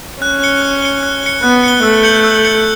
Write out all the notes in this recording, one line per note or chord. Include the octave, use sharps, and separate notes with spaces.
C#4 F#6
C#7 G7
F#6
C#7 G7
F#6
C#7 G7
B3 F#6
C#7 G7
A3 E6
G6 C#7 F#7
E6
G6 C#7 F#7